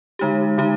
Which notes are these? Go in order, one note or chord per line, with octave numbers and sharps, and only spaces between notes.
D3 G#3 D#4 G4
D3 G#3 D#4 G4